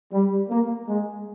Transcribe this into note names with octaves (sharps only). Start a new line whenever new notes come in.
G3
A#3
G#3